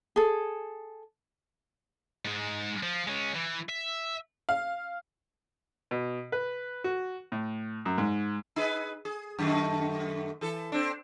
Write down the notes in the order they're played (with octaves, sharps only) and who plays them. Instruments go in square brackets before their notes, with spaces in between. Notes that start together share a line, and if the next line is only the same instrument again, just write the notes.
[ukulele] G#4 A4
[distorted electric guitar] G#2 G#3
F3
G#3 C#4
E3
E5
[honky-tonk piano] F5
[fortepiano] B2
B4
F#4
A2
F#2
G#2
[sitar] D#4 G#4 B4
G#4
F#2 D#3 A3
E3 A4
C4 D4